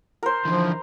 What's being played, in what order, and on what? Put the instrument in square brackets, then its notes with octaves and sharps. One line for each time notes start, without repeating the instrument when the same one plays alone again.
[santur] A#4 C5
[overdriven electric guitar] D3 E3 [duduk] F3